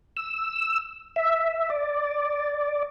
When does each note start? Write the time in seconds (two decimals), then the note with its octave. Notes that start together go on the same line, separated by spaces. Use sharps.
0.17 E6
1.16 E5
1.70 D5